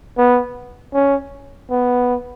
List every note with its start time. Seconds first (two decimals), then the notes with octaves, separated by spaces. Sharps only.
0.18 B3
0.93 C#4
1.70 B3